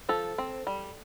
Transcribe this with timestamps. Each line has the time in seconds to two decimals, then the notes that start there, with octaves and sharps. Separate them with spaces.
0.09 F3 A4
0.38 C4
0.67 G3